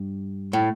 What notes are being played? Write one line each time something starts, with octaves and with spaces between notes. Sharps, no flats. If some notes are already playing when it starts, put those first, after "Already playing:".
Already playing: G2
A2